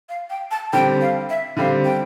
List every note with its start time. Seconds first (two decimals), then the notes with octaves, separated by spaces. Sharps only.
0.09 F5
0.30 G5
0.51 A5
0.73 D3 G3 C4 G5
1.01 F5
1.30 E5
1.57 D3 G3 C4 F5
1.85 G5